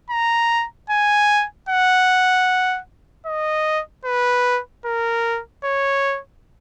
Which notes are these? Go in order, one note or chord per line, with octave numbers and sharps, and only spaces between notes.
A#5
G#5
F#5
D#5
B4
A#4
C#5